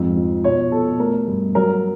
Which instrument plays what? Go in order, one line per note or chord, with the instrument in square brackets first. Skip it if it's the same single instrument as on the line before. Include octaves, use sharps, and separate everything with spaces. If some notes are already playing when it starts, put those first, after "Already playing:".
Already playing: [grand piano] F2 G#2
F3
B2 C#5
B2 A4
A3 A#4
G2
F#3 A#4